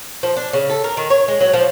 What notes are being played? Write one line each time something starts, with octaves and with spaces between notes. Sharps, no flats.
F3
D4
C#3
A4
A#4
D#3
C#5
G#3
F#3
F3